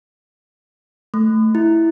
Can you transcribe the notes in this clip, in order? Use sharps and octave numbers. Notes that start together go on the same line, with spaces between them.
A3
E4